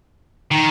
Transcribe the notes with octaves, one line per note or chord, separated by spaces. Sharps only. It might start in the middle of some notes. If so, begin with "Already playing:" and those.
D#3